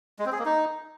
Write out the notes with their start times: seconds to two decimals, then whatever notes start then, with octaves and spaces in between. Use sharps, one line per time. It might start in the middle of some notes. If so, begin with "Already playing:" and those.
0.19 G#3
0.26 C4
0.32 G#4
0.39 A#3
0.45 D#4